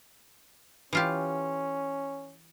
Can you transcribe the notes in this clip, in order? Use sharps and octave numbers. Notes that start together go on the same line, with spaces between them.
E3 C#4 F4 G4